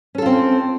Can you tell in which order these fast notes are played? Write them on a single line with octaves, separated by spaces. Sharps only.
C#4 A4 F4 C4